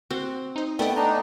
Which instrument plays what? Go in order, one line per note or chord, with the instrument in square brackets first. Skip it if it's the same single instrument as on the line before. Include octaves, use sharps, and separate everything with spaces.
[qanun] C4 [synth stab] F#4
[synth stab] D#4 C5
[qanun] A3 B3 [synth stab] D5 D#5 [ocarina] G5
[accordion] D4 D#4 [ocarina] A#5